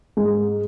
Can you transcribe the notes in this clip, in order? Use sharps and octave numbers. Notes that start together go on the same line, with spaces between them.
G#2